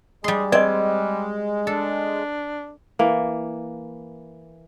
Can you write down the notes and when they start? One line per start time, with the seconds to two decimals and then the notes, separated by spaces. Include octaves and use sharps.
0.24 G3 G#3 G#4 C6
0.52 G3 C4 D5 D#5
1.67 D4 A4
2.99 E3 A#3